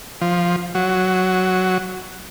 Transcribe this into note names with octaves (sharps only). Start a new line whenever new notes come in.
F3
F#3